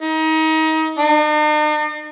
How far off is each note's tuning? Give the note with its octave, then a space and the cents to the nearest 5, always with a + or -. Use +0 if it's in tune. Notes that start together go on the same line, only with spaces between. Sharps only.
D#4 +30
D#4 -45